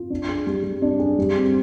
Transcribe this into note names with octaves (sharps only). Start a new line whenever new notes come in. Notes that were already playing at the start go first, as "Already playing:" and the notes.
Already playing: F4
D4
G#4
G3
G3
D4
G#4
G3
C4